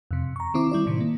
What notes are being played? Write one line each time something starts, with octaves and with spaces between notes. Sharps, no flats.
F2 C3
A#5 C#6
D#3 C4 E4 D6
G3 E4 D5
A2 C3 D#3
A#3